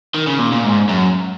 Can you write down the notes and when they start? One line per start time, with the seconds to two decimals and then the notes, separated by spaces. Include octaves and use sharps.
0.14 D#3
0.27 C#3
0.39 A#2
0.52 A#2
0.64 G#2
0.89 F#2